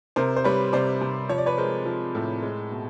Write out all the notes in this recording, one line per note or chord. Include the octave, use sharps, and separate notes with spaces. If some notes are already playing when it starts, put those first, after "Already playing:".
C3 A#4 C5
C5
G3 B4 C#5
C3 C5 D5
C3
F3 C#5
D5
B4 C#5
G#3 A#4 C5
F3
A2
G#3
B2